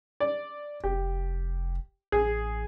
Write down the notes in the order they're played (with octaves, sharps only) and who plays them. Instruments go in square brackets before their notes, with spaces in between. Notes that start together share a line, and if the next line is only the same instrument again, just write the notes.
[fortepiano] D5
[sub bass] F1 [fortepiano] G4
[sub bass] A1 [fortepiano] G#4